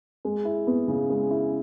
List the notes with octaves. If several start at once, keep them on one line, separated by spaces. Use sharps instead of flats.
G#3
E4
B3
C#3
G#3
E4